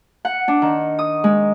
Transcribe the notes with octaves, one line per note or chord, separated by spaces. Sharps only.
F#5
D4
D#3
D#6
G#3